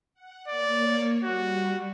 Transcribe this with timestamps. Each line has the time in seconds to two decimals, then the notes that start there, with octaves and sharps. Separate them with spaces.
0.14 F#5
0.48 A#3 C#5 D5
1.24 G3 F#4